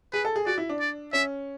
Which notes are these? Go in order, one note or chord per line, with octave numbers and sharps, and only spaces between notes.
G#4 B4
A4
G#4
F#4 D5
E4
D4
D5
C#4 E5